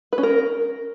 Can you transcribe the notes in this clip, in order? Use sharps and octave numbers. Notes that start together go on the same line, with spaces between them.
B4
C#4
A#4